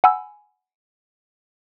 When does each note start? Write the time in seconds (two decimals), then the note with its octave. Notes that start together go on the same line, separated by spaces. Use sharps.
0.04 F#5 G#5 B5 E6